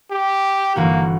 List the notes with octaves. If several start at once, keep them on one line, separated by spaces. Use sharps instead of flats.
G4
G1 E3 A#3 F#4